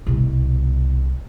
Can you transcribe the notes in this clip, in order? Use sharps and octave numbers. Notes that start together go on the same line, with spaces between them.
C2 B2